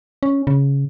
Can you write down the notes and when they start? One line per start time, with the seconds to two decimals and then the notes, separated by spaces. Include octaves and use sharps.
0.23 C#4
0.47 C#3